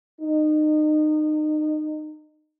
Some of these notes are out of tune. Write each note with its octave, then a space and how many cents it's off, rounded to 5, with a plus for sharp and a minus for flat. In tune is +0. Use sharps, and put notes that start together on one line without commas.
D#4 -30